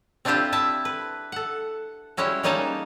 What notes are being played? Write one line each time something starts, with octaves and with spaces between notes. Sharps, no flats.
C4 D4 E4 F4 G4 C5
E4 E5 A5
B4
A4 F#5
G3 G#3 C#4 E4 F#4
G3 A#3 C#4 D#4 G#5 A5